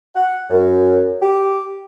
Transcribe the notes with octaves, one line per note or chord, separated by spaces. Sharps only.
F#5
F#2
G4